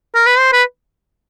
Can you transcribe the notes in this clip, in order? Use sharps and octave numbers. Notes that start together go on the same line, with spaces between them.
A#4
B4
C5
B4